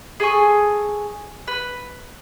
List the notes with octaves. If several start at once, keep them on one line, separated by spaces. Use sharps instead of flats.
G#4 A4 G#5 C#6
B4